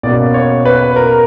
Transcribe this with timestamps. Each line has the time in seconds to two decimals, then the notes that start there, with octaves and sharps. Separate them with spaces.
0.03 B2 A#3 C#4 D5
0.34 C#5
0.65 B4
0.96 A#4